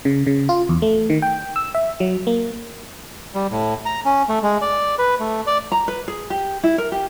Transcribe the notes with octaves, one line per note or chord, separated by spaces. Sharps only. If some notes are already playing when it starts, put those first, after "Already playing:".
C#3
C#3
F4
E2
A3
D#3
G5
E6
E5
F#3
A#3
G3
A2
A#5
C#4
A3
G#3
D5
B4
A3
D5
A#5
B4
G#4
G4
E4
A#4
G4